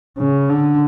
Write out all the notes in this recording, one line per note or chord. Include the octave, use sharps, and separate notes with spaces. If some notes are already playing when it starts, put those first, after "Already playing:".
C#3
D3